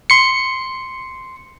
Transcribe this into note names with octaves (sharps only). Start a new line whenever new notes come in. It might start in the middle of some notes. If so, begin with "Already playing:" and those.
C6 C#7